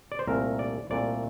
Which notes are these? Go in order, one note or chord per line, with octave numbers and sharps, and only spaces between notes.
D5
C5
C2 A#2 A3 A#4
D5
C2 A#2 A3 D5